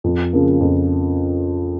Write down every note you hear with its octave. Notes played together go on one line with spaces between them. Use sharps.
F2
C#3 F3 A#3
F2